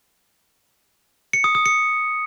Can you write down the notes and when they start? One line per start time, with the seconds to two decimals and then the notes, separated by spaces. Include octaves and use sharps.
1.33 C#7
1.44 D#6
1.55 D#6
1.66 C#7